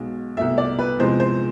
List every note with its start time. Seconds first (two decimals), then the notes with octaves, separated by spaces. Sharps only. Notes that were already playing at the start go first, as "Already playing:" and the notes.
Already playing: B1 B2 G#3
0.37 C2 B2 A3 E5
0.58 D5
0.79 B4
0.99 E2 C3 F3 G#3 C5
1.20 C5